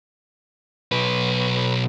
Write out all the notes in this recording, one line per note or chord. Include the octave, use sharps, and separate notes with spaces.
B1 B4